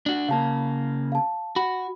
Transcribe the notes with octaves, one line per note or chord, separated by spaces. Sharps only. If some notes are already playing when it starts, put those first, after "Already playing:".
D4 F#4
C#3 A#3 F5 A5
F5 A5
F#4 B5